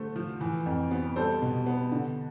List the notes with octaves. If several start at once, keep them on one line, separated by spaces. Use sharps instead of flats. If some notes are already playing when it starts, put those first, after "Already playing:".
Already playing: D3 G3 A3 C5
F3
E3
F2
B3
G3 A4 C5
B2
B3
D3